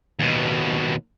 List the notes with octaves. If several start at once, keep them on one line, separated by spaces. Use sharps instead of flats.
D#2 B2